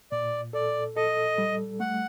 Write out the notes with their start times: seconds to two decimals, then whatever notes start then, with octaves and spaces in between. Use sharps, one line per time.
0.12 A#2 D5
0.53 A4 D5
0.96 A4 D#5
1.38 G3
1.80 A3 F#5